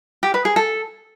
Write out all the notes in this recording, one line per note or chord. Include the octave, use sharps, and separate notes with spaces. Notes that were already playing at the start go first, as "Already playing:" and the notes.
G4
B4
G#4
A4